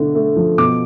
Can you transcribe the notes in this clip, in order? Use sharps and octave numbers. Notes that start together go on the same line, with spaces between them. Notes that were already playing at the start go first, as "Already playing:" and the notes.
Already playing: B2 D3 A3
A3
F3
B2 D6